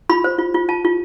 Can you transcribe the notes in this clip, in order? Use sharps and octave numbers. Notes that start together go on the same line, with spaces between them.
F4 B5
C5
F4
F4
F4 A5
F4